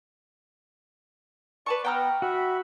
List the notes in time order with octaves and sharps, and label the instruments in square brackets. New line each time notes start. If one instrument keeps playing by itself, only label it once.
[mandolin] B4 A5 C#6 [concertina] D5
[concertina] B3 F#5 [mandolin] G5 A#5 F6
[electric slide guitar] F#4 [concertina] E5 B5